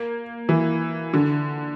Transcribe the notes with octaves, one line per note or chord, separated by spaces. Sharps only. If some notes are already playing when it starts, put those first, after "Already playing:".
Already playing: A#3
E3
D3